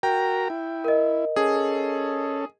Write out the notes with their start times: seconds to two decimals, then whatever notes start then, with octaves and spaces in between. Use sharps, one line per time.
0.03 F#4 A#4 G5 A#5
0.50 E4
0.84 A#4 D#5
1.36 C#4 G#4 A4